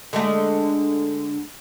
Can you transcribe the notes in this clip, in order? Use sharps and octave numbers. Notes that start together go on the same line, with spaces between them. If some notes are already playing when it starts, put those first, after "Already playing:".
D3 G#3 A3